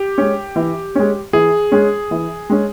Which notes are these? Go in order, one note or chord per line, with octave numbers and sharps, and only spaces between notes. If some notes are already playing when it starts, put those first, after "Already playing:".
Already playing: G4
G#3 C#4
E3
G#3 C#4
E3 G#4
G#3 C#4
E3
G#3 C#4